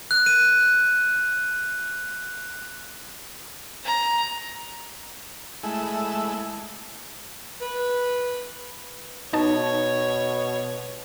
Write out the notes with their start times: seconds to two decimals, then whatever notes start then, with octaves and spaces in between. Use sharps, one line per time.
0.11 F#6
0.26 D#7
3.85 A#5
5.63 G#3 A3 E4
7.61 B4
9.33 B2 D#4 C#5 A5